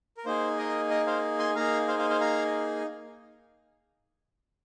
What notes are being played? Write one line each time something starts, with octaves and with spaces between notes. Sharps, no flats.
A#4
A#3 D#4 G#4 C5
A#4 D#5
A#4 D#5
C5 F5
G#5 C6
A#3 D#4 G#4 F5 A#5
C5 F5
C5 F5
C5 F5
F5 A#5